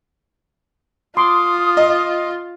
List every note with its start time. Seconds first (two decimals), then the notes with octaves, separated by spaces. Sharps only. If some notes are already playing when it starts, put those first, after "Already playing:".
1.17 F4 C6 D6 D#6
1.77 D#5